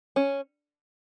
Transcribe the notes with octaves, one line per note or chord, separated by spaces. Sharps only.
C#4